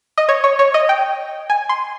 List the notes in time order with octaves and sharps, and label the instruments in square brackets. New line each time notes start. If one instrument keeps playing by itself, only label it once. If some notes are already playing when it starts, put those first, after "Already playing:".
[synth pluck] D#5
C#5
C#5
C#5
D#5
G5
G#5
C6